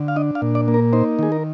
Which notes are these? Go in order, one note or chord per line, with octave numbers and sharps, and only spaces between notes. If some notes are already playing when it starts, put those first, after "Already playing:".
Already playing: D3
F5
D4 D#5
F5
A#2
D5
A#3
A#4
D#4 C5
D#3 G#4
A#4